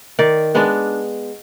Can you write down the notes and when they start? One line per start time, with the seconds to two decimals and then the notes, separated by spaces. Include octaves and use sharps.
0.19 D#3 D5
0.55 G#3 B3 D4